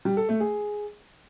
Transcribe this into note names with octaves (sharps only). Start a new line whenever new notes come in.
G3
A4
A3
G#4